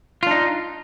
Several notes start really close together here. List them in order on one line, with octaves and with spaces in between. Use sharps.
F4 D4 D#4